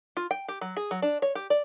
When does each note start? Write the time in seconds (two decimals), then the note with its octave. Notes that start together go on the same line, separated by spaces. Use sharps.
0.17 F4
0.31 G5
0.48 G4
0.61 F#3
0.77 G#4
0.91 F#3
1.02 D4
1.22 C#5
1.35 G4
1.50 D5